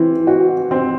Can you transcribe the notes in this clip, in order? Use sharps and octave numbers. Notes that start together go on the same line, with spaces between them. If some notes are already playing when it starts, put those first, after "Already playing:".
Already playing: E3 C4
F#4
C4